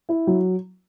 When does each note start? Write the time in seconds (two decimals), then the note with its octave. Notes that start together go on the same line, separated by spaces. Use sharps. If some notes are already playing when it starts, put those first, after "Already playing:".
0.09 E4
0.27 F#3